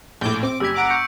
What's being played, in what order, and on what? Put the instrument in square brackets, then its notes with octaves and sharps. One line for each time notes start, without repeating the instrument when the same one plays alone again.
[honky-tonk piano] A#1 A2 [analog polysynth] D6 G6
[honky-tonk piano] C4 [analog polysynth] D6
[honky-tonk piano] F#1 [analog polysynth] G3 G4 G#6 [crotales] E6 B6
[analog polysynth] F#5 A#5 D6 [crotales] E6 D7
[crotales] C#6 G6 C#7